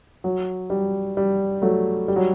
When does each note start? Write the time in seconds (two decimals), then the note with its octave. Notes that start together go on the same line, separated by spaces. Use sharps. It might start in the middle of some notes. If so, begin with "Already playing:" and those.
0.24 F#3
0.70 G3
1.17 G3
1.62 F#3 A3
2.08 G3
2.16 F#3